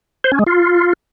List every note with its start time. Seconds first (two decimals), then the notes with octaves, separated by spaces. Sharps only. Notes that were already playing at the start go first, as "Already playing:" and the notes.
0.24 C5
0.32 C#4
0.39 G#3
0.46 F4